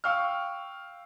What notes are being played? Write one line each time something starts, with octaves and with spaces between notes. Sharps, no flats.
F5 G5 C#6 E6 F6